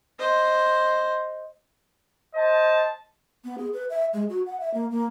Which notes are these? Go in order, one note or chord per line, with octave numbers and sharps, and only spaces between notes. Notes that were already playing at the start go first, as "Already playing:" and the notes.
C5 D#5
C5 D#5 A5
B3
G#4
B4
E5
G#3
F#4
F#5
E5
A#3
A#3